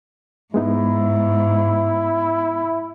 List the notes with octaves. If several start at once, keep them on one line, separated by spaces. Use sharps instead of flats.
G#2 G#3 B3 D#4 E4